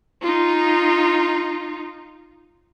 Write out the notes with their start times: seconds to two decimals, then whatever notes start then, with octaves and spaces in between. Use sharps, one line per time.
0.22 D#4 F4